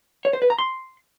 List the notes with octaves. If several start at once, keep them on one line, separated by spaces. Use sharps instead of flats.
C#5
C5
B4
A#5
C6